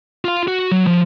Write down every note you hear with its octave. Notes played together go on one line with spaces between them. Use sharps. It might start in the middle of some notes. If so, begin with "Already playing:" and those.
F4 F5
F#4
F#3
F3